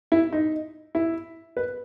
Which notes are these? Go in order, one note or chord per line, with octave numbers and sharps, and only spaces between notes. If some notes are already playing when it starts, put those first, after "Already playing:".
E4
D#4
E4
B4